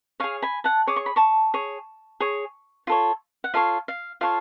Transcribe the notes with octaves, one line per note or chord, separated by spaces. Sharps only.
G#4 C#5 F5 G#5
G#5 B5
F#5 A5
G#4 C#5 D6
C#6
B5
A5 C#6
G#4 C#5
G#4 C#5
F4 A4 C#5
F#5
F4 A4 C#5 F5
F5
F4 A4 C#5 F5